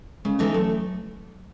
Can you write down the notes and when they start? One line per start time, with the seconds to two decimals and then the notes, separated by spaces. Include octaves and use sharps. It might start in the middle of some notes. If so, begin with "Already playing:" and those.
0.25 C#3 G#3
0.39 E3 G#3 B3 D#4 A4
0.54 F#3 A3